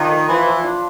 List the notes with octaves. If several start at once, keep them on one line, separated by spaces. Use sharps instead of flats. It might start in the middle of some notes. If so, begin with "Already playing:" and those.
Already playing: D#3 F3 D4
A3
E3 F3
F3
D4